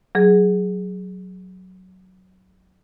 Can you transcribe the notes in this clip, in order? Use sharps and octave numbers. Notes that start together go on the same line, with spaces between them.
F#3 G#4